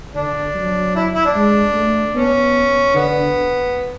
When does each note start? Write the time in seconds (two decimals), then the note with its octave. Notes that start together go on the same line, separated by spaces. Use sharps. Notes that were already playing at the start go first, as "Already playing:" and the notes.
0.15 D3 D4
0.55 F#3
0.95 E4
1.14 E4
1.25 D4
1.35 G#3
1.74 A3
2.14 B3 C#4
2.94 D3 B3